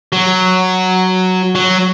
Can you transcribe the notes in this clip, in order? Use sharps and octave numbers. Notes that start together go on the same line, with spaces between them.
F#3
F#3